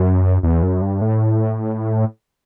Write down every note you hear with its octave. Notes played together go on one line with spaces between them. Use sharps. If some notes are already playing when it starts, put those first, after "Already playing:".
Already playing: F#2
E2
F#2
G2
A2